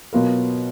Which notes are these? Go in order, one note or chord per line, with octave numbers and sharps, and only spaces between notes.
B2 F#3 B3 F4 A#4